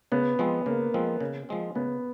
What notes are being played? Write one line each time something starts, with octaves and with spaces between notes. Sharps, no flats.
C#3 B3
F3 G#3 C4
C#3 A#3
F3 G#3 C4
C#3
F3 G#3 C4
C#3 B3